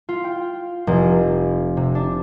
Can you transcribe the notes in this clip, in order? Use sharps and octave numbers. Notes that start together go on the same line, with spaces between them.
F4
G5
F1
C3
D4